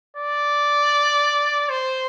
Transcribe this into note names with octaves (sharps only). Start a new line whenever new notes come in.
D5
C5